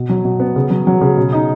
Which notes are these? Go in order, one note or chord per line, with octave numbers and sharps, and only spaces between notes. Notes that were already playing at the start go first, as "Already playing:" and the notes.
Already playing: B2
F#3
B2
B3
C#3
F#3
F#3
C#3
B2
D#4